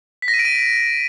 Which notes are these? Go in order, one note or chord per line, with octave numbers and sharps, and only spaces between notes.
B6
A#6
D#7
D7
D#7